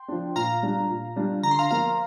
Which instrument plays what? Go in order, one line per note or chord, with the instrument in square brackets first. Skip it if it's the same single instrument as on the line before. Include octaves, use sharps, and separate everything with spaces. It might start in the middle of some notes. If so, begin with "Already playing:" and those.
Already playing: [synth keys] G5 C6
[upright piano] F3 D4
[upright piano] A#2 [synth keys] F5 A#5
[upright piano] G3 D4 F4
A#2
G3 D4 F4
[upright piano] D3 [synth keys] A#5
[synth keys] C6
F5 A#5
[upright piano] F3 A#3 F4 [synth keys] F5 A#5